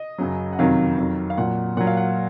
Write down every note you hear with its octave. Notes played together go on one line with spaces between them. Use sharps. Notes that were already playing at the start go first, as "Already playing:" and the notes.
Already playing: D#5
F#2 C#3 F#3
F#5
F2 C3 D#3 F#3 F5
F2 D#3 F#3
F5
A#2 F#3 F#5
A#2 F#3 F#5
F5
F#5